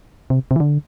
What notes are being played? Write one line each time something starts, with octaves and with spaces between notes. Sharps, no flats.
C3
C3
E3
D3